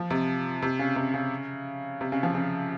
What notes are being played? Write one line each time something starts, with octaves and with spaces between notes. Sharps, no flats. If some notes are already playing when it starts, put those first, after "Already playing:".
Already playing: F3
C3
C3
C#3
C3
C#3
C3
C#3
F3
C#3